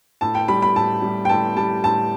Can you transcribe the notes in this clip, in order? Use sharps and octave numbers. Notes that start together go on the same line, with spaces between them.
A2 A5
G5
G3 B5
B5
A2 A5
G3
G5
A2 A5
G3 A5
A2 A5